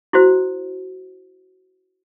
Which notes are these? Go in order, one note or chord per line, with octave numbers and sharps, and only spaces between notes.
E4 F#4 C5